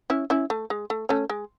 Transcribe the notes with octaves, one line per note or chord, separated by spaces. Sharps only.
C#4 E4
C#4 E4
A3
G#3
A3
A3 C#4
G#3